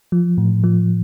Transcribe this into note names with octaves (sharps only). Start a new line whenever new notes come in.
F3
A2
F3